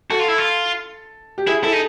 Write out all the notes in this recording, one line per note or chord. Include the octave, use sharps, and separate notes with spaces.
F#4 A4
F4
E4
F4
G4
E4 G#4
E4 A4
D#4